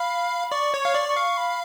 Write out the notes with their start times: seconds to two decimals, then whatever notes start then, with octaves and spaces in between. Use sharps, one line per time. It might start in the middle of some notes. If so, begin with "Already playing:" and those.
Already playing: F5 B5
0.52 D5 C#6
0.74 C#5
0.81 F5 C#6
0.94 D5
1.09 C#6
1.16 F5
1.37 B5